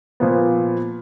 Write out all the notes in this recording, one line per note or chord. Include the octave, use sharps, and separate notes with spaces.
A#2 F3 B3